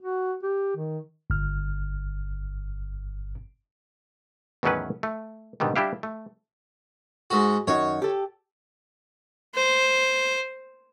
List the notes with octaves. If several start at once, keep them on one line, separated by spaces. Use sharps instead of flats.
F#4
G4
D#3
G1 F6
E2 A2 D#3 F#3 C#4 B4
A3
G#2 B2 D3 D#3 G3
G3 D4 E4 G4 F5
A3
G#2 F#4
F#2 D#3 F#4 C#5
G4 A4
C5